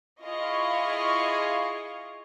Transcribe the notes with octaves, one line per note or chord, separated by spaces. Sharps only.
E4 F4 G#4 D#5 F5 C#6